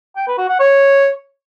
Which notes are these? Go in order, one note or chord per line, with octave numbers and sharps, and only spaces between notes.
G5
B4
F#4
F#5
C#5